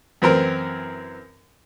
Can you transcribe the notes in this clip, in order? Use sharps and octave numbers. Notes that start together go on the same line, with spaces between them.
F#2 E3 C4 A#4